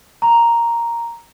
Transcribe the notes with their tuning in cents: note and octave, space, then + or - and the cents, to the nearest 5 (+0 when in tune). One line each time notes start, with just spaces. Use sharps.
A#5 +0 C#6 -5